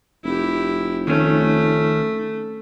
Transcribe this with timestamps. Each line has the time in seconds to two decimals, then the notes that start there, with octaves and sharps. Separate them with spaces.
0.24 F1 E4 G4
1.07 D#3 A3 C#4